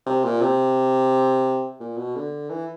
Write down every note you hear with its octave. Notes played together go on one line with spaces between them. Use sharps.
C3
A#2
C3
A#2
B2
D3
E3